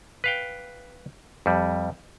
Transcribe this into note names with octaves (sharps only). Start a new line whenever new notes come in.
B4 F5 G5
F2 G3